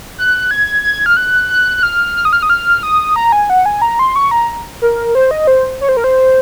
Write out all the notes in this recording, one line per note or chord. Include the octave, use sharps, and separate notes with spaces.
F#6
G#6
G#6
F6
F#6
F#6
F#6
F6
F6
D#6
F6
D#6
F6
D#6
A#5
G#5
F#5
G#5
A#5
C6
C#6
A#5
A#4
C5
D#5
C5
C#5
C5
A#4
C5